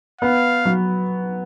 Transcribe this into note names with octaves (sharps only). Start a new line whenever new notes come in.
B3 F5
F#3